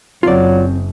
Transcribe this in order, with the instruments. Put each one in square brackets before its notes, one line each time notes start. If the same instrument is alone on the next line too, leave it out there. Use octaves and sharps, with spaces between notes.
[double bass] F#1 [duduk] F#3 [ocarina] C4 [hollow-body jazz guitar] F4 D5